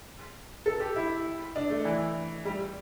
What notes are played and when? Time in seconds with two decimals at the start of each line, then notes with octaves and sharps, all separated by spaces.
0.66 A4
0.80 G4
0.96 E4
1.56 D4
1.70 A3
1.85 E3
2.45 G3